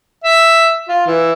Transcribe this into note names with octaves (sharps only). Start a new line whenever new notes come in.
E5
F4
E3